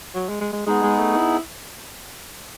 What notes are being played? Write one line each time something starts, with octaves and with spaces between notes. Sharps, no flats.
F#3
G#3
G#3
G#3
G#3 B3 D#4 G#4
G#3
A3
E4